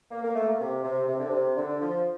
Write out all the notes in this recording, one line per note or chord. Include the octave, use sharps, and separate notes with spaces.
A#3
A#3
A3
A#3
C3
C3
C3
D3
C3
D3
F3